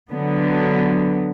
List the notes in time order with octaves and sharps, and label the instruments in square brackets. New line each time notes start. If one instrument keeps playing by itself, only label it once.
[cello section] D3 F#3 B3